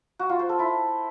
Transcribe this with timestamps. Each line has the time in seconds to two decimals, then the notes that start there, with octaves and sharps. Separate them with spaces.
0.19 F#4
0.29 F4
0.39 C5
0.49 A4
0.59 E4